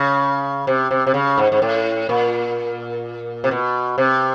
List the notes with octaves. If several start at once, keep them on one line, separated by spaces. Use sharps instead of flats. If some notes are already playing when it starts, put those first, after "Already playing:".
Already playing: C#3
C3
C3
C3
C#3
G#2
G#2
A2
A#2
C3
B2
C3